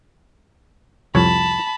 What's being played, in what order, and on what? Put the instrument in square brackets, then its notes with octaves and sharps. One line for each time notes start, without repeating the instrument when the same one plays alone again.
[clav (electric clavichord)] C2 F2 C#5 [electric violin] A5 B5